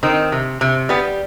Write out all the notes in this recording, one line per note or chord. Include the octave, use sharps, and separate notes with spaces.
D#3 C4
C3
C3
G3 B3